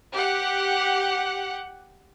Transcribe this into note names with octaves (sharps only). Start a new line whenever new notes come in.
G4 F#5